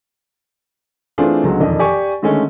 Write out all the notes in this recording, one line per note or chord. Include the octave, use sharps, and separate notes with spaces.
E3 A3 C4 D4 F4 G#4
C#2 D3 F#3 G#3 B3
E1 F2 D#3 D5 D#5
G4 D5 G#5 C#6
D3 D#3 G#3 A3 C#4